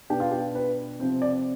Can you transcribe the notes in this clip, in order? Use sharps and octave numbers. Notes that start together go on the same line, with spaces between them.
B2 B3 D4 G4
F4
G4
B4
C3 F3 C4 C5
D5